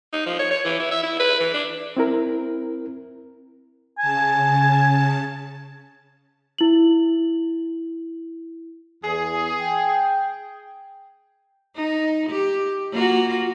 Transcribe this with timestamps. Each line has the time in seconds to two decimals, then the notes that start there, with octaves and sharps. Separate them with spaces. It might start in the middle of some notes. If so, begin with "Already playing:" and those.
0.13 D#4
0.26 F3
0.39 C#5
0.51 C#5
0.65 E3
0.79 E4
0.91 E5
1.03 E4
1.20 B4
1.40 E3
1.54 D4
1.97 C4 E4 A#4
3.99 C#3 G#5 A5
6.58 E4 F#7
9.04 E2 G#4
9.62 G5
11.75 D#4
12.30 G4
12.92 A#3 F4 F#4